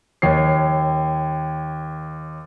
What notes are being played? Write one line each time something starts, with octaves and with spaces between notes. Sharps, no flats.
D#2 C#5 C7